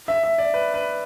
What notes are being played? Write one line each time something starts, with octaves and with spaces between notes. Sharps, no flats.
E5
E5
D5
B4
B4